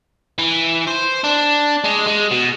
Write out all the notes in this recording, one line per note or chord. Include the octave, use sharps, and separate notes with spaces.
E3
C5
D4
G#3
G#3
B2